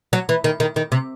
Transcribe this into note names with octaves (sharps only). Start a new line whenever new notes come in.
F#3
E3
D#3
D#3
D#3
C3